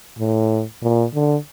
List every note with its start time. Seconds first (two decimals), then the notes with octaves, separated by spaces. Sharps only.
0.19 A2
0.83 A#2
1.14 D3